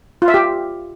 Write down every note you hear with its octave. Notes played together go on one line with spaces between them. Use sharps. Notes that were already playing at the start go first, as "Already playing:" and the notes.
F4
E5
G4